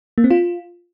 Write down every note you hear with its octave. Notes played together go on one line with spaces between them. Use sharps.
A#3
C4
F4